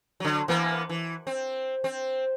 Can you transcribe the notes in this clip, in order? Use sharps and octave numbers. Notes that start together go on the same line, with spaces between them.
D3 F#3
E3 A#3 B3
E3
C4
C4